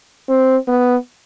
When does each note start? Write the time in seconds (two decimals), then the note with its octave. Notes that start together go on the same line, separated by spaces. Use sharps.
0.29 C4
0.68 B3